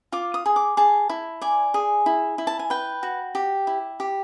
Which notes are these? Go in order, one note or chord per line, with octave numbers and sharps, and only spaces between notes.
F4 D6
D#6
G#4
D6
G#4 A5
E4
D5 G#5
G#4
E4
E4
A5
G#5
B4 G5
F#4
G4
E4
G4